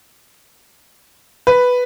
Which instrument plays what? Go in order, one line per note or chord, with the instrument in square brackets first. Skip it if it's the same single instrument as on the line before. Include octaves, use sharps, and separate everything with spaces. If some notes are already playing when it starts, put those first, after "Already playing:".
[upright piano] B4